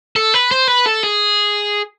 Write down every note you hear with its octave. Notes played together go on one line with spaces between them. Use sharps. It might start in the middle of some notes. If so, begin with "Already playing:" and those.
A4
B4
C5
B4
A4
G#4